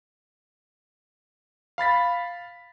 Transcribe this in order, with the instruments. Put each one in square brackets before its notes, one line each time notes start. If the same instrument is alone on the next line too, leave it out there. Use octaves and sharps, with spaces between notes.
[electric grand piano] F5 B5 A6 B6